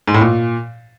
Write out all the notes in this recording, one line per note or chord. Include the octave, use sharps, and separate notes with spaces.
G#2
A2
A#2